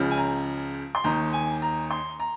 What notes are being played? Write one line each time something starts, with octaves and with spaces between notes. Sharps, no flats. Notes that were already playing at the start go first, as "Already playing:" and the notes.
Already playing: C#2 C#3 F3
G#5
A#5
C6
D#2 D#3 A#5
G#5
A#5
C6
A#5